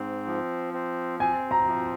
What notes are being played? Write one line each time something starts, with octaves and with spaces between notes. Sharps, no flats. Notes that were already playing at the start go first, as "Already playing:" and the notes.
Already playing: G#2 C4
F3
C4
C4 G#5
A#5
F3